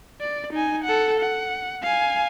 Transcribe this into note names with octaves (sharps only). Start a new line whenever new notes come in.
D5
D#4 G#5
A4 F#5
F#5
F5 G#5